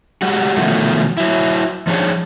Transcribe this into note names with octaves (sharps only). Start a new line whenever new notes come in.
G3 G#3 F#4
B2 D#3 F3 F#3 A3
F#3 E4
F3 D4 D#4 G#4 C#5